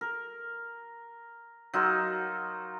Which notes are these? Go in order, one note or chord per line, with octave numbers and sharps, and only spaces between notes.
A#4
F#3 D#4 F4 A#4